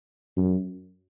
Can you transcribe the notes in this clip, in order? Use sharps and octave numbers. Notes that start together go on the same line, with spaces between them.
F#2